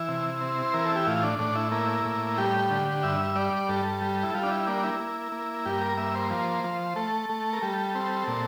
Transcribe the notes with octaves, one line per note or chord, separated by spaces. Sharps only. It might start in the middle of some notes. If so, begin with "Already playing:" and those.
Already playing: E3 E4
C3
C4
C5
E3 A#4
A4
G4
A2 F4
D4
A2 D4
E4
A#3 E4
A2
G3 G4
D3
G2 E5
G3 D5
G2 A4
G3
E4
G3 F4
D4
E4
A#3 D4
E4
A#3
A#3
G2 G4
A#4
A#3 E5
C5
F3 C5
F3
A3 A4
A3
A#4
G3 A4
C4
A#2